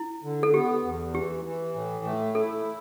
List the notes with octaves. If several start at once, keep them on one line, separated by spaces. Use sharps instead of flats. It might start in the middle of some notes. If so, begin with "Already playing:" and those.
Already playing: E4
D3
A4
B3 G4
E2
E3 G4
E3
A2
A3
E4 A4